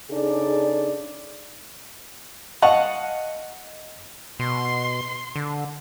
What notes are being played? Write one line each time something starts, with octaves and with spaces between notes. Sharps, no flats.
C#3 D4 D#4 G#4 A4 D5
D#5 F5 F#5 A5 C#6
B2 C6
D3